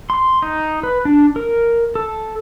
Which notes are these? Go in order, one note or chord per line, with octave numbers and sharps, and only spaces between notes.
C6
D#4
B4
D4
A#4
A4